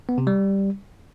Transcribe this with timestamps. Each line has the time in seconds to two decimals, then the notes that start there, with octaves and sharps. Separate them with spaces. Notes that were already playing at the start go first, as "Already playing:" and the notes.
0.09 B3
0.18 C3
0.27 G3